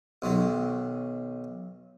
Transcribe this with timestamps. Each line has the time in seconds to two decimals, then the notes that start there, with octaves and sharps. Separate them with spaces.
0.22 B1 D#3 F#3